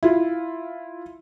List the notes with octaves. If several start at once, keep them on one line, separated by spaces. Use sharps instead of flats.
E4 F4